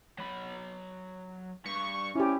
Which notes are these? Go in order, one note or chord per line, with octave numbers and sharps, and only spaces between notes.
F#3 B5
G2 C#6
C#4 E4 G4